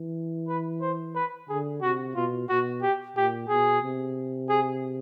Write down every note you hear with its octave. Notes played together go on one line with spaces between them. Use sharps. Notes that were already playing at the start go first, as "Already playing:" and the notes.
Already playing: E3
B4
C5
B4
D3 G#4
C3 F#4
B2 F4
B2 F#4
G4
A#2 G4
B2 G#4
C3
G#4